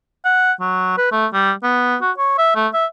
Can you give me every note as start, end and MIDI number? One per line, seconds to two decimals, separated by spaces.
0.25 0.52 78
0.60 0.97 54
0.98 1.07 71
1.12 1.26 57
1.33 1.52 55
1.63 1.96 59
2.01 2.11 66
2.18 2.34 73
2.38 2.54 76
2.56 2.68 57
2.73 2.86 76